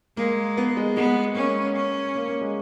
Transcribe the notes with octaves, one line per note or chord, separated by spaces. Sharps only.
G#3 A#3
B3
G#3
G#3 B3
A#3 C#4
C#4
A#3
A#3
G#3